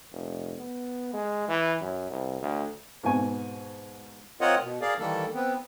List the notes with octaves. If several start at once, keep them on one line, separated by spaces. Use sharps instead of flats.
F1
B3
G#3
E3
F#2
C2
D2
G#2 B2 B3 G#5 C#6
C4 F4 A#4 C#5 D#5 F#5
B2
G#4 A#4 D5 F5
D#3 E3 G3 A#3 A4
B3 C4